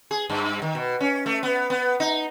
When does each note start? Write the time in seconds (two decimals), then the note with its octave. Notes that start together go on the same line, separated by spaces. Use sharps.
0.11 G#4
0.30 G2
0.62 D#3
0.75 B2
1.00 C#4
1.26 A3
1.43 B3
1.70 B3
2.00 D#4